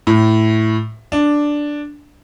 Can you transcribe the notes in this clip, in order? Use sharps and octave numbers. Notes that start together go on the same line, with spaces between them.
A2
D4